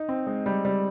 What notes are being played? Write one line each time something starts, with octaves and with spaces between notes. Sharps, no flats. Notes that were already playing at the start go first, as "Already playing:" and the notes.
Already playing: D#4
C4
G#3
G3
G3